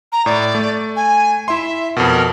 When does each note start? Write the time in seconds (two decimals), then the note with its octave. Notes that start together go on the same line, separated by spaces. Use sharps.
0.12 A#5
0.26 A2 D5
0.55 A3
0.96 G#5
1.48 E4 E5 C6
1.97 F2 B2 A#4